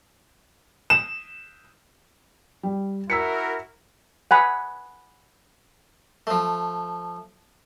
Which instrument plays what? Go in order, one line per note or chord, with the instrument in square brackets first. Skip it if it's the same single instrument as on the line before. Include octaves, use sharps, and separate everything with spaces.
[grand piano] E7
[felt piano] G3
[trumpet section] E4 F#4 A#4 [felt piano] E6 B6 C#7
[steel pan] F#5 G#5 B5
[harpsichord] F3 A3